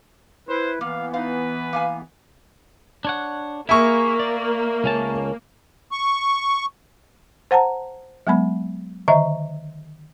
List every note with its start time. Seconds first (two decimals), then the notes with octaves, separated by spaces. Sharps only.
0.49 E4 B4 C5
0.81 E3 A#3 B3 F5
1.14 D#4 B4 F5
1.73 A#3 F5 G#5
3.05 D4 C#5 F#5
3.69 A#3 E4 G#4 A#4 E5 C#6
4.20 D5
4.84 C#2 C#4 A5
5.92 C#6
7.51 C5 F#5 A5 A#5
8.27 F#3 G#3 B3 B5
9.08 D3 D#3 D#5 E5 A#5